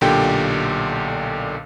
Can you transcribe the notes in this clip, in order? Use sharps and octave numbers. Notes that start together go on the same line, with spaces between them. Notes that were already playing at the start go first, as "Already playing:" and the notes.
B1 A#2 D3 G4 G5